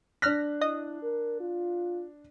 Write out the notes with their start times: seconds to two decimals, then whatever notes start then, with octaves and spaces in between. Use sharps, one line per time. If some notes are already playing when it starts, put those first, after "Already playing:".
0.22 D4 F6 F#6 A#6 B6
0.61 E4 D#5 D#6
1.02 A#4
1.40 F4